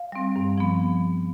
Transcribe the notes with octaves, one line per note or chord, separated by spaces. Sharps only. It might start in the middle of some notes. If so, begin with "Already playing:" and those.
Already playing: F5
G3 C4
G2
F3 B3